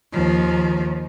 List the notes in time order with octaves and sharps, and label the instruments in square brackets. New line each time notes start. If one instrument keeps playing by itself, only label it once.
[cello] D#2 F3